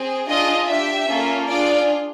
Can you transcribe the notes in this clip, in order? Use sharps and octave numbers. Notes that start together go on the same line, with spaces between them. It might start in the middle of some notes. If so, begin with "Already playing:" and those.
Already playing: C4 G#4
D4 F4 G#4 D#5
D4 G4 E5
A#3 C#4 F4 A4
D4 F4 G#4 D5